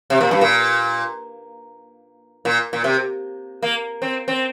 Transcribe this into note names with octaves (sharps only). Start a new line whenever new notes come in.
C3
A#2
G2
A#2
A#2
A#2
C3
A#3
C4
C4